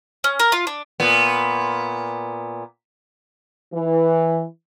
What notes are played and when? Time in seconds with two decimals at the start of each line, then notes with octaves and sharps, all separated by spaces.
0.24 C#4
0.39 A#4
0.52 F4
0.67 D4
1.00 A#2 B3
3.74 E3